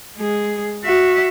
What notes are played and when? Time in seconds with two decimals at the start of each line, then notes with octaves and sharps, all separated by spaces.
0.17 G#3 G#4
0.84 F#4 E5